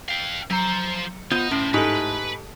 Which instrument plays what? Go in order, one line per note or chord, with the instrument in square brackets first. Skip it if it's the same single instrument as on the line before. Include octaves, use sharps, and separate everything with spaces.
[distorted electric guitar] F5 G5
[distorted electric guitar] F3 C5 [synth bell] F#3 C#7 [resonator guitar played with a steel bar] A#5
[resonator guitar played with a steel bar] B3 F4 C5 [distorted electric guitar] D#4
[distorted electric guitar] D2 C4 [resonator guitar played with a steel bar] A2 [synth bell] C#4
[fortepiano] G#2 [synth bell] G4 A4 [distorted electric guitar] B4